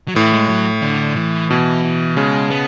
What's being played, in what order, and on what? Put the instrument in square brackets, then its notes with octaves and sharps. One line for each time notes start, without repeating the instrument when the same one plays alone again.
[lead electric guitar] F#3
[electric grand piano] A2 [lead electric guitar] E3
[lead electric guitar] G#3
F#3
D3
E3
[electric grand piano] B2 [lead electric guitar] E3
[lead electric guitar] E3
[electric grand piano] C#3 [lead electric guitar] G#3
[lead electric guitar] B3